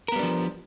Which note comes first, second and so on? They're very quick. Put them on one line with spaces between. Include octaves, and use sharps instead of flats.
A#4 B3 G3 D4 F3